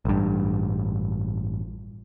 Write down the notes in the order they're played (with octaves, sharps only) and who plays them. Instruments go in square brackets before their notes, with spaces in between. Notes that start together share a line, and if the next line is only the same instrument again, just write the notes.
[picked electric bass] A1 G2